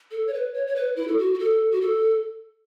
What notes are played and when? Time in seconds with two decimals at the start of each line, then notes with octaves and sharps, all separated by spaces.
0.11 A4
0.27 C#5
0.33 B4
0.54 C#5
0.67 C#5
0.76 B4
0.96 E4
1.08 A4
1.18 F#4
1.34 F#4
1.39 A4
1.71 F#4
1.81 A4